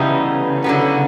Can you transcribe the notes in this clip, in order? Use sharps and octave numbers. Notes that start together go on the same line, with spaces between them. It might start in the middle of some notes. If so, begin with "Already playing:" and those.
Already playing: A2 C#3 E3 G3 B3 D#4
D3 F#3 B3